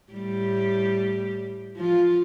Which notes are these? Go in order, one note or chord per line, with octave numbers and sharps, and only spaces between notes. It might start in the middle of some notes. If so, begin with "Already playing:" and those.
A2 G3 G4
F3 F4